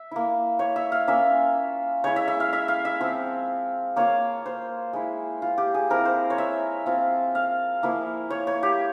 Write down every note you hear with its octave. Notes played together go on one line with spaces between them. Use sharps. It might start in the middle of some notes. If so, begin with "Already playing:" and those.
Already playing: E5
A#3 E4
C#5
E5
F5
A#3 C#4 F4 E5
G#3 E4 C#5
E5
E5
F5
E5
F5
E5
F3 C4 F4
A#3 F4 C#5
C5
G#3 E4
F4
G4
G#4
F3 C4 E4 A#4
C5
C#5
E5
F3 C4 F4
F5
F3 A#3 E4
C#5
C#5
G4